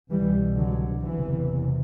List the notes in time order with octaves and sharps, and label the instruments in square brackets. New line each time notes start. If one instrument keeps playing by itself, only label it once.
[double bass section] C2 B2 E3 G3
D3 F#3
F#1 E2 C3 E3